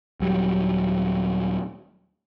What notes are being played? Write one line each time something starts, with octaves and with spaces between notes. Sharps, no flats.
D#1 F#3 G3